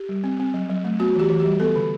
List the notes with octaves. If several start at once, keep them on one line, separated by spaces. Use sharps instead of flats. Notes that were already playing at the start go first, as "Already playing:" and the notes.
Already playing: G4
G3
C4
C4
F#3
F#3
A3
B3 F#4
E3 G4
E3
G4
G3
B3 A4
D3